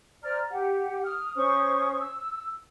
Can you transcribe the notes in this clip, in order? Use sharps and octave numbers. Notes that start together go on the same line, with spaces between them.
C5 D5 A#5 F6
G4 F#5
D#6 F6
C#4 C5 C#6 D#6
E6